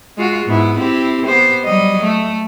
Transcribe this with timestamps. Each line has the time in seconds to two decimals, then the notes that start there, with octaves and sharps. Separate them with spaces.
0.17 G#3 F4 F#4
0.46 G#2 B3 E4
0.78 C4 E4 G4
1.26 B3 G4 C5
1.65 F#3 G3 D#5
2.03 A3